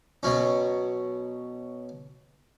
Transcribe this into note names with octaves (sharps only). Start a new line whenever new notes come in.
B2 F#3 C#4